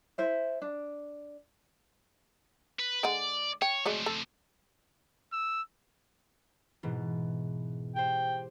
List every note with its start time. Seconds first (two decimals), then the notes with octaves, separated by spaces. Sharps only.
0.18 E4 C5 E5
0.62 D4
2.79 B4
3.03 D3 G#3 D5 F#5
3.62 C#5 G5
3.86 F#3 G#3 A3 C4 D5
4.06 A4
5.33 E6
6.83 G#2 B2 E3
7.96 G4 C5 G5